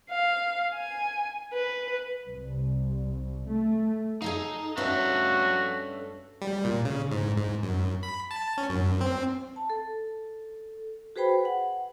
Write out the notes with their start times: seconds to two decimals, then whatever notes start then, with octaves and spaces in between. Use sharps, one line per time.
0.10 F5
0.75 G#5
1.53 B4
2.26 C2
3.49 A3
4.22 D#4 G#4 A4 F5
4.77 G2 C#4 F#4 A4 B4 E5 F5
6.42 G3
6.65 A#2
6.85 C#3
7.11 G#2
7.38 G#2
7.63 F#2
8.03 B5
8.31 A5
8.58 C#4
8.69 F#2
9.01 C4
9.56 A5
9.70 A4
11.16 F#4 G#4 B4 C5 G5 B5
11.45 F#5